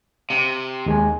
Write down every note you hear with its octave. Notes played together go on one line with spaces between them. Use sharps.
C3
D#2 G#3 G#5